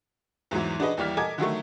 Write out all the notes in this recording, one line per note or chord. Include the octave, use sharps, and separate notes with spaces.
E2 G#2 E3 F#3
D4 F#4 G#4 B4 D#5
D#2 E3 G3 D5 F6 B6
A4 A#4 D#5 G#5 D6 G#6
D3 D#3 F#3 A3